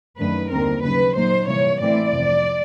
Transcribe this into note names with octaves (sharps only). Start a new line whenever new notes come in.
F#2 D#3 F#3 A3 D4 B4
D#2 D3 G3 C4 A#4
D#2 C#3 F#3 B4
A#2 F#3 A#3 D#4 C5
C3 E3 G3 A#3 C#5
A2 E3 A3 C4 E4 D5
F2 C3 F3